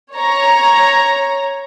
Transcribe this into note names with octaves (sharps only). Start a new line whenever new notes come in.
C#5 A#5